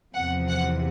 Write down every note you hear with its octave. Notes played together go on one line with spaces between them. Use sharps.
E2 C3 F3 F#5
F#5